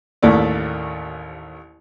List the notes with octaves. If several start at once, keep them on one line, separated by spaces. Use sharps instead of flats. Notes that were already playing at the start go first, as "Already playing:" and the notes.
A1 D#2 A3 A#3 D5